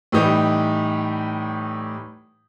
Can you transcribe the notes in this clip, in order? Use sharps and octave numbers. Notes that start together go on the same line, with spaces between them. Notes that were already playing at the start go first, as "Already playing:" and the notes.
A2 E3 G3 D#4 G4